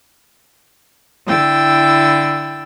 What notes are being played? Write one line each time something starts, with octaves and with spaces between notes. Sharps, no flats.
D3 E4 G5 E6 A6